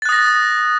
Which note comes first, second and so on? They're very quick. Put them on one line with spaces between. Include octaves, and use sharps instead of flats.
A6 F#6 D#6 A#6